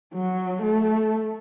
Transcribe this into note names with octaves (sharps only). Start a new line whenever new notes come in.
F#3
A3